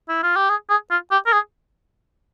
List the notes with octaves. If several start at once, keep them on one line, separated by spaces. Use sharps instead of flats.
E4
F4
G4
G#4
G#4
F4
G4
A#4
G#4